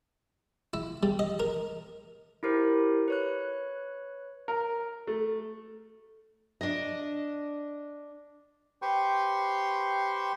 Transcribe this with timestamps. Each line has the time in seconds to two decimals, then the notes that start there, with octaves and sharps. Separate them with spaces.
0.74 E4
1.03 G3
1.19 D#5
1.40 A#4
2.43 E4 G4 A#4 C5
3.08 B4 C#5 F#6
4.48 A#4
5.07 A3
6.61 D4 D#5
8.82 G4 B4 C5 G5 C6 C#6